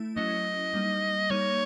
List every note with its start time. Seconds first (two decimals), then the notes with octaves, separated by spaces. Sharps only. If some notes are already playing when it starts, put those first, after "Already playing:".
Already playing: A3 E4
0.16 F#3 A3 C#4 E4 D#5
0.74 G3 A#3 D#4
1.30 G3 A#3 D#4 C#5